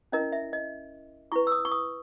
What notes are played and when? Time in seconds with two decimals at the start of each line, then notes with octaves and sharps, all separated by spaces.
0.12 C#4 E4 A#4 D#5
0.32 E5
0.53 D#5
1.32 E4 B4 C#6
1.47 E6
1.52 D#6
1.65 C#6
1.72 D#6